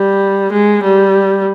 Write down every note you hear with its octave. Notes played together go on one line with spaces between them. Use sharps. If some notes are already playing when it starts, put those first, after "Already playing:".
Already playing: G3
G#3
G3